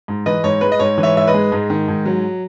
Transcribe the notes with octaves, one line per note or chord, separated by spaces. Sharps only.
G#2
E3 B4 D#5
G#2 C#5
G#3 B4
D#5
G#2 C#5
E3
C#5 E5
G#2 E5
B4 D#5
G#3
G#2
D#3
G#2
F#3